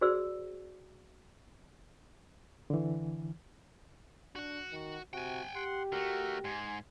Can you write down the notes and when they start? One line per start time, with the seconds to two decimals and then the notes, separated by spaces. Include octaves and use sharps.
0.01 F#4 G#4 B4 C5 D5 E6
2.70 D3 E3
4.36 D4 F#4 F#5
4.72 D#3
5.13 C3 F#4 G5 G#5
5.55 G4 F#5 C6
5.92 D3 A3 F#4 A#4
6.44 G#2 G#5 C6